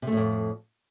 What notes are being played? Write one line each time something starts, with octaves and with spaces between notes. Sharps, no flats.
F2 A2 C3 A3